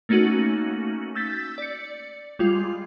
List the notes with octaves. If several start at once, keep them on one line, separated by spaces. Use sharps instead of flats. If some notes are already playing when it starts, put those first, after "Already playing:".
A3 A#3 C#4 D#4 F#4
E6 G6 A6 B6
D5 C#7
G3 G#3 F4 C7